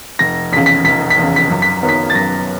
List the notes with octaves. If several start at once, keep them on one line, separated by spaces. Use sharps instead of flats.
F1 A#6
E2 C#3 B6
B6
F1 B6
B6
E2 C#3
B6
F#2
B6
D#3 F#3 B3
B6
A6
F#2 A#6